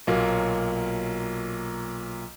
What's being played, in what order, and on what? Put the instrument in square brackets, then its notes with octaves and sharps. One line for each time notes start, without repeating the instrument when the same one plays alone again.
[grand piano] B1 A#2 F#3 A#3